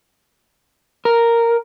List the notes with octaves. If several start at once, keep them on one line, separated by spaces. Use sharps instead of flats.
A#4